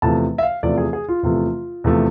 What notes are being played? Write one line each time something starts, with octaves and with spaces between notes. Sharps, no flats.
E2 C3 F3 A3 A5
E5
F5
E2 C3 F3 A3 D5
G#4
G#4
F4
E2 C3 F3 A3 F4
E2 C3 F3 A3